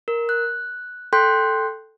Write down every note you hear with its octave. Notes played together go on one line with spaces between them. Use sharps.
A#4
F#6
A4 G5 C6 F#6 G6